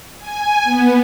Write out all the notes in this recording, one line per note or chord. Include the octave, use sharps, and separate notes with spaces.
G#5
B3